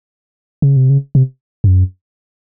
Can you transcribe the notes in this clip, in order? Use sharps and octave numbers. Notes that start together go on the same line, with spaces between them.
C#3
C3
C#3
C3
G2
F#2